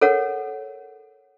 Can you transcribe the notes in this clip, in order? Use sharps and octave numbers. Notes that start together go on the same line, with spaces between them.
A4 A#4 C#5 F#5